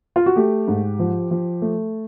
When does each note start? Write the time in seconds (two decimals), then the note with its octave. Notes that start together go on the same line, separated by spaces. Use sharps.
0.16 F4
0.26 F#4
0.36 A3 G4
0.68 G#2
0.99 F3
1.31 F3
1.62 A3